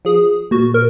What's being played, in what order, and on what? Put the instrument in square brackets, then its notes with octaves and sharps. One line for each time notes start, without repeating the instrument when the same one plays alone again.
[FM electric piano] F3 [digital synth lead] G#4
[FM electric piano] A#2 [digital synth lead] F#4
[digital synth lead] A#4